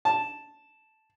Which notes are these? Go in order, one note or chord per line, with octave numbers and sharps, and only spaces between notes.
A5